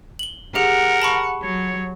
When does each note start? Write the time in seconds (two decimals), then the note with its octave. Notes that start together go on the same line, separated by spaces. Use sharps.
0.19 F#7 G7
0.55 G4 G#4 A#4 F#5
1.02 A5 B5 C#6
1.43 F#3 C#5